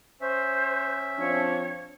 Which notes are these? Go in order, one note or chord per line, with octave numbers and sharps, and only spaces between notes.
C#4 C5 E5
F3 C4 D4 C#5